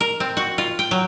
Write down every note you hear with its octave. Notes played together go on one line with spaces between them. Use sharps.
A#4
C4
F#4
F4
G5
F#3